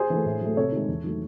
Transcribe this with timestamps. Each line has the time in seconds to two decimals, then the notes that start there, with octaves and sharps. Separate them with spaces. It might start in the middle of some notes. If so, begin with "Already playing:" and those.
Already playing: G#4 C5
0.10 E3 A3
0.26 A2
0.41 F#3 A3
0.56 C3 A4 C#5
0.72 D#3 G#3
0.88 E2
1.04 D#3 F#3 A3